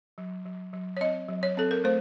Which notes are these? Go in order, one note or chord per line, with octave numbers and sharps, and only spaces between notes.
F#3
F#3
F#3
C#5
C4 D#5
F#3
C#5
C4 A4
A#4
A3 C5